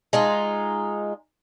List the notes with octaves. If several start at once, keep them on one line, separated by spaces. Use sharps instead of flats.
G#3 D#4 F4